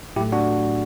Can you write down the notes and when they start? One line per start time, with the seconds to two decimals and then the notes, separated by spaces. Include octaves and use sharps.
0.16 A2 F#3 A3 E4 G4
0.32 D4 F#4